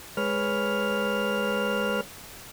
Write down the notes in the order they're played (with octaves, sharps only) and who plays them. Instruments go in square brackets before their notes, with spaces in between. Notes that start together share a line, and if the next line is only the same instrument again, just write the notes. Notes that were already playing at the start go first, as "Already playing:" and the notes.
[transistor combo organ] G#3 B4 C#5 F6